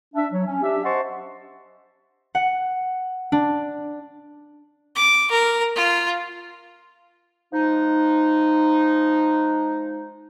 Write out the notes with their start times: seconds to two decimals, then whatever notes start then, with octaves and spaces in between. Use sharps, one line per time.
0.15 D4 E5
0.32 F#3 C#5
0.47 C#4
0.62 D4 G4 E5
0.84 C5 D#5 F#5 A5 C6 C#6
2.35 F#5
3.32 D4
4.96 D6
5.31 A#4
5.76 F4
7.53 F3 G#3 D#4